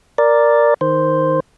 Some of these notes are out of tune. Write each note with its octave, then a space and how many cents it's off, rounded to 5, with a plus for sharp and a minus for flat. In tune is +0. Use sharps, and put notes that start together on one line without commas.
A#4 +0 D5 +0
D#3 +0 C5 +0